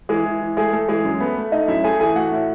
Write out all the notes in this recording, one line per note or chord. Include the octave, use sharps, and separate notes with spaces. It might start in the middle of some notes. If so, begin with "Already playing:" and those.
E3 G#3 G#4
E3
E3
G#3 A3 G#4
A3 A4
E3 G#3 G#4
F#2
A3 B3 B4
A3
A3 D#4 D#5
F#2 E4 E5
A3 G#4 G#5
E3 G#4 G#5
A3 F#4 F#5
A2